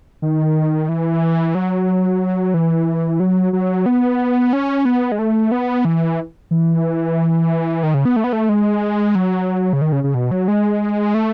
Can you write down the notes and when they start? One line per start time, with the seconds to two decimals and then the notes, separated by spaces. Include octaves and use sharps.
0.22 D#3
0.89 E3
1.55 F#3
2.54 E3
3.20 F#3
3.53 F#3
3.86 B3
4.53 C#4
4.85 B3
5.12 G#3
5.19 A3
5.52 B3
5.85 E3
6.51 E3
7.83 D#3
7.94 C#3
8.05 B3
8.16 A3
8.24 B3
8.33 A3
8.49 G#3
9.15 F#3
9.73 C#3
9.81 D#3
9.92 C#3
10.04 C#3
10.15 B2
10.31 F#3
10.48 G#3
11.14 A3